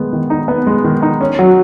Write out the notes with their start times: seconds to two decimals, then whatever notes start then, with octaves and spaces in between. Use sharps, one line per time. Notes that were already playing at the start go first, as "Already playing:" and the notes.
Already playing: D#3 G#3 B3
0.13 D#3
0.30 D#4
0.48 B3
0.67 G#3
0.84 D#3
1.02 D#4
1.21 C#4
1.39 F#3